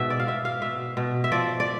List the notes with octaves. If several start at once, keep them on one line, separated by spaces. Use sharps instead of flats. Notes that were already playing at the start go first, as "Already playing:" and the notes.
Already playing: G#2 B2 E5
D5
F5
B2 E5
F5
B2 E5
B2
E5
F3 D5
D5